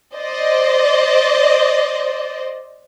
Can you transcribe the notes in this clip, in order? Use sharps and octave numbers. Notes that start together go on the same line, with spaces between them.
C5 D5 D#5